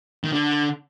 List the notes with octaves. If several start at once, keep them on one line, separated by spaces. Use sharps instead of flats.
D#3
D3